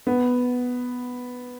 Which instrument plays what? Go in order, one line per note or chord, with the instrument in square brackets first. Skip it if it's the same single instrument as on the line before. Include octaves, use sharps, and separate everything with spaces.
[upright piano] B3